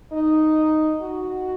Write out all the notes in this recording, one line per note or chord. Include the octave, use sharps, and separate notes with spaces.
D#4
F#4